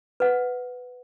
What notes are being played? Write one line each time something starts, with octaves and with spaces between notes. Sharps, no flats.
B4 F#5